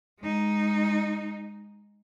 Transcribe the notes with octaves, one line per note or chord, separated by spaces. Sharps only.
G#3 D#4